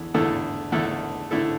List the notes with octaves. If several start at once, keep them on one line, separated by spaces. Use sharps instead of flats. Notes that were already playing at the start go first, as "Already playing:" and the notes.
Already playing: E2 D3 E4
E2 D3 A3 E4 A4
E2 D3 A3 E4 A4
D3 A3 E4 A4